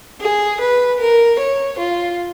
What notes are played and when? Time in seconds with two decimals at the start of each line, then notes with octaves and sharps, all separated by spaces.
0.21 G#4
0.60 B4
1.00 A#4
1.39 C#5
1.78 F4